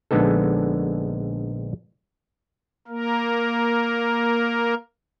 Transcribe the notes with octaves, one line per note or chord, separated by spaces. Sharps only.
A#1 D3 G#3 B3 D#4 A4
A#3 A#4